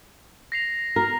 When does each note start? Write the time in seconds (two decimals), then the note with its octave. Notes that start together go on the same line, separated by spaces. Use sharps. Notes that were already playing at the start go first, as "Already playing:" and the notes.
0.52 A#6 C7 F7
0.96 A#4